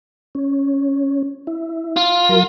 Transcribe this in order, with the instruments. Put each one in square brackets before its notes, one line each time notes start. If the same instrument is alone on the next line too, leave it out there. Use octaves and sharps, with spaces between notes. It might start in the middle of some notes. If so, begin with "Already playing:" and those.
[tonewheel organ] C#4
E4
[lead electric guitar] F4
[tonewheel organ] F#3 A#4